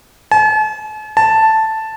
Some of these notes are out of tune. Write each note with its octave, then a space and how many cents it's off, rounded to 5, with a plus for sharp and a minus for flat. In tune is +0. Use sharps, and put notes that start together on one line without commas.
A5 -45
A5 +0